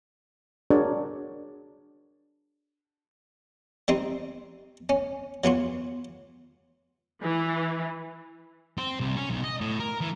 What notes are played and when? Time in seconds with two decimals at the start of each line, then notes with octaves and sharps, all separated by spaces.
0.70 D4 F#4 G#4 A#4 C#5 D5
3.88 G3 C4 D#4
4.89 C#4
5.44 F#3 B3 F4 F#4
7.21 E3
8.78 C4
9.00 C2
9.17 C#4
9.30 B1
9.44 D#5
9.61 A2
9.80 A#4
10.01 E3